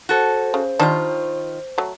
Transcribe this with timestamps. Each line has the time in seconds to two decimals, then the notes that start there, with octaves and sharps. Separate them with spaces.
0.09 F#4 A4 C5
0.54 C#3
0.79 D#3 G3 D4 F4
1.78 F#3 A3